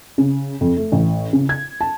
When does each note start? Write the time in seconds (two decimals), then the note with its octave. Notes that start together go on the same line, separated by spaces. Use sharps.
0.18 C#3
0.61 F2
0.77 A3
0.92 A1
1.33 C#3
1.49 G#6
1.81 A5